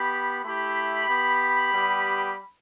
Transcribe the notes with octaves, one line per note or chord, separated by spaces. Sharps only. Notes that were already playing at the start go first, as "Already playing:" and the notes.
Already playing: B3 G4 B5
A3 E4 G4 B5
B3 G4
G3 B3 G4